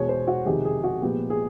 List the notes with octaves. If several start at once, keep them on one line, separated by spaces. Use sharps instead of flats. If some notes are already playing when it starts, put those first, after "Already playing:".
Already playing: E2 B2 G#3 C#5
C5
F#4
F2 C3 D#3 G#3 G4
G#4
F#4
A#2 F3 G#3 B3 G4
G#4